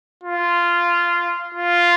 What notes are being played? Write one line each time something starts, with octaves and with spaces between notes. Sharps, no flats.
F4
F4